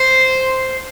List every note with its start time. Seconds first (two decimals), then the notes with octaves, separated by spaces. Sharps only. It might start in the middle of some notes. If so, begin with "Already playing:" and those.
Already playing: C5